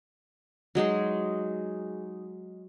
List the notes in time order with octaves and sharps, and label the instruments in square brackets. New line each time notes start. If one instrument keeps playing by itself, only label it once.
[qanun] F#3 G#3 D#4 G#4